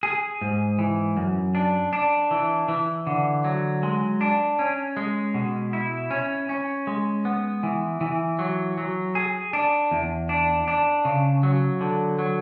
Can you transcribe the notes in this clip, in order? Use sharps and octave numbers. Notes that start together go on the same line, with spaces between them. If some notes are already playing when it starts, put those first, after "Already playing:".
G#4
G#2
E3
F#2
D4
D4
E3
E3
D3
F#3
G#3
D4
C#4
G#3
B2
E4
C#4
C#4
G#3
B3
E3
E3
F#3
F#3
G#4
D4
E2
D4
D4
C#3
F#3
D3
F#3